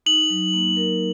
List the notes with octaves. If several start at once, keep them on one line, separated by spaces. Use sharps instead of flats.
D#4 F#7
F#3
A#3
A#4